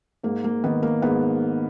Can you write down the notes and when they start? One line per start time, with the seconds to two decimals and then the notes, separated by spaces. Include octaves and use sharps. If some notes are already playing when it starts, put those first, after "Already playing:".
0.23 G#2 A#3
0.44 A#3
0.64 D#3 B3
0.83 A#3
1.02 G#2 B3